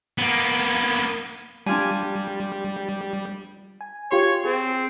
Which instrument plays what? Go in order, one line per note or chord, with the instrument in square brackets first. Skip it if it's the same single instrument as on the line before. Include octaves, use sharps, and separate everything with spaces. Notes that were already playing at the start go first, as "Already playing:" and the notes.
[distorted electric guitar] A#3 B3
[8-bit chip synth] G3 [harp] D4 F4 G#5
[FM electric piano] G#5
[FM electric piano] F4 G4 C6 [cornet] C#5
[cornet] C4 [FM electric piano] G#4